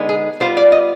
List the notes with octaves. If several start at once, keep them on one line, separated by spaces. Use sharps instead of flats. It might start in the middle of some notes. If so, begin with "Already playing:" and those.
Already playing: D3 G#3 B3 D#4
G#4
G3 B3 F4 C5
D5
D#5